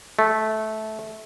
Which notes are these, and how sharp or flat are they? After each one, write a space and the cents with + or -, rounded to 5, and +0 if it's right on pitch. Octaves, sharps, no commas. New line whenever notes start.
A3 -15